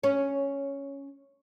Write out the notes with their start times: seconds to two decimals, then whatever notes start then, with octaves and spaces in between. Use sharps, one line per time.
0.03 C#4